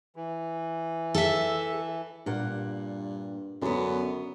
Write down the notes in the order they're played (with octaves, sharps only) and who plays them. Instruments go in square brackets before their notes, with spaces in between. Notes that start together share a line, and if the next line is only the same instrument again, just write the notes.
[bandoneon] E3
[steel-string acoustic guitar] A4 E5
[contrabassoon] G2 [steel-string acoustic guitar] A#2 F#5
[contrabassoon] F#2 [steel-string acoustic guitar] D3 B3